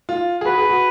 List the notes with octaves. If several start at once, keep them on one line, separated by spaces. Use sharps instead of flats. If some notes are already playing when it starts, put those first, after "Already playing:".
F4
G#4
F#4 B4
G#4
F#4